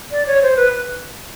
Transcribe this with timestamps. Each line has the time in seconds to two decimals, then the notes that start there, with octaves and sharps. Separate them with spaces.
0.12 D5
0.26 C#5
0.42 C5
0.57 B4